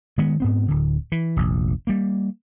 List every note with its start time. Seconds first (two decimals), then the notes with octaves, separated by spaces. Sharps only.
0.18 D#3 G#3 B3
0.40 G#2 B3 C4
0.68 D1 D3
1.12 E3
1.36 F1 A#1
1.87 G3 A#3